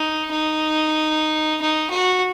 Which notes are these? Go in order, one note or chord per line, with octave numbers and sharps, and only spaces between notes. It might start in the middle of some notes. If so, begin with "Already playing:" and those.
Already playing: D#4
D#4
D#4
F#4